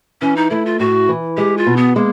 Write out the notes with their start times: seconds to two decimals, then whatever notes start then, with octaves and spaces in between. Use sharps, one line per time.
0.21 E3 C#4
0.36 D#4
0.50 A3 E4
0.66 F4
0.79 A2 F#4
1.09 E3
1.37 G#3 G4
1.58 F4
1.66 B2
1.77 B3
1.95 G#3 A#3